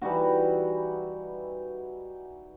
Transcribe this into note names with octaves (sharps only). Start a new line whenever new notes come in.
E3 G3 D#4 F#4